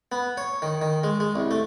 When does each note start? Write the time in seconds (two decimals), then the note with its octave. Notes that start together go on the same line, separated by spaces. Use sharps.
0.12 B3
0.37 C#5
0.62 D#3
0.82 D#3
1.04 G#3
1.20 G#3
1.36 C2
1.51 A3